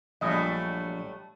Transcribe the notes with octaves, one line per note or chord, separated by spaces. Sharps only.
A#1 F#3 G3 A3 D#5